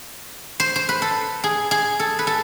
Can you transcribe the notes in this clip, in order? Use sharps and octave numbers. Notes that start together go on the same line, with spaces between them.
C5
C5
B4
A4
G#4
G#4
A4
B4
A4